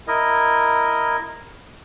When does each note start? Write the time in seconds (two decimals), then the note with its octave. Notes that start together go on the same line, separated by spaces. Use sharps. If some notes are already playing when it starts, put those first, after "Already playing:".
0.08 E4 A#4 D#5